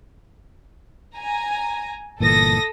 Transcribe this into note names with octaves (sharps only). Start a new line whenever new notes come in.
G#5 A#5
G1 A#2 E3 A4 D#6 A#6